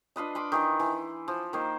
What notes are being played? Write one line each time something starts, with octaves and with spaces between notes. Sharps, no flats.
D4 F4 B4 D#5
B5 C6 D6
D#3 E3 C6
E3
F3
D#3 A#3 C5